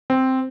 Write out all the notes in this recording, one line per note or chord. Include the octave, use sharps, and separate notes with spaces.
C4